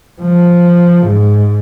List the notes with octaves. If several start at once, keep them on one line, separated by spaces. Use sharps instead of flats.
F3
G#2